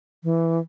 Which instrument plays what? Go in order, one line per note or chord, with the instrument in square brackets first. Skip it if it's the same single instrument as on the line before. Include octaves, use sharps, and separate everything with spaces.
[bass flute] E3